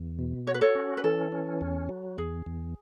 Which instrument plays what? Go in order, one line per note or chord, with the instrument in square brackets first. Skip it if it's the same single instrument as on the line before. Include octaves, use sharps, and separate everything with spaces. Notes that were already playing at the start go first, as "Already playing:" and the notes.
Already playing: [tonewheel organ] E2
B2
[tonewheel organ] F#4 [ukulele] C#5
[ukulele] B4
A4 C#5
[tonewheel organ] C#4
[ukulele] B4
[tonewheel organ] E3 [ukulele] A4
[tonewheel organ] C#4
E2
F#3
[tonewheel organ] E2 [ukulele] G#4
[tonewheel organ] E2